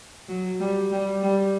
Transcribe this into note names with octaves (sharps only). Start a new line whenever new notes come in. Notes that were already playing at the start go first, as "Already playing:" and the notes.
F#3
G3
G3
G3